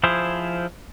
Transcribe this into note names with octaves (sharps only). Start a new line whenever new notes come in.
F3 E4 G#4 C5